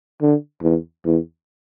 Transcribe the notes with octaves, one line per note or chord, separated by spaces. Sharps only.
D3
E2
E2